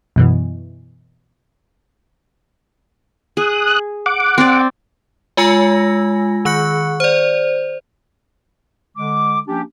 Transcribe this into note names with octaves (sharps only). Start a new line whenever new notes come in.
F#2 B2 E3
G#4 D#6 F#6
F#5 D6
C4 D5
G#3 F4 G#5 E6 A#6
D#3 C#6 F#6 C#7
C5 D5
D3 G#3 D6
F3 A#3 C#4 D4 G4